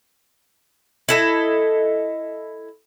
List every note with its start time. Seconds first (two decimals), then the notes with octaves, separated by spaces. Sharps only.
1.09 E4 A4 D#5